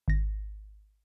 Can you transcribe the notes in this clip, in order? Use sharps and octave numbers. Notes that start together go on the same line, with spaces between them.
G#1 A#6